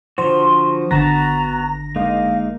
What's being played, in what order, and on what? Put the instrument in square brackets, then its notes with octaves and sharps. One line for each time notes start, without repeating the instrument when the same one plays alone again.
[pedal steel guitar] D3 F3 F#4 [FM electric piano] C5 [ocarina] C6
[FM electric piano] G#1 D3 A#6 [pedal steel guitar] B3 F#4 A5 [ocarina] A#5
[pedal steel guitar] G#3 A#3 D#4 [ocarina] F5